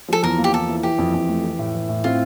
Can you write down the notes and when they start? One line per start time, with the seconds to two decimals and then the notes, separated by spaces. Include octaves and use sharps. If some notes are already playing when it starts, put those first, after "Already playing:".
0.08 F3 A4
0.23 E2 A#4
0.38 A#3
0.44 G4
0.53 E2 A4
0.69 E3
0.83 E3 G4
0.98 F2
1.14 F2
1.29 A3
1.44 E3
1.59 A2
1.74 E3
1.89 A2
2.04 C4 F4